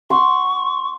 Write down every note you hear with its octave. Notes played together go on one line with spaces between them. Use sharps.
F#5 C6 C#6